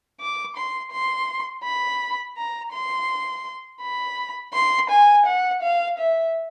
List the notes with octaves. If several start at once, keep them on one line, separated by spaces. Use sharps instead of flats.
D6
C6
C6
B5
A#5
C6
B5
C6
G#5
F#5
F5
E5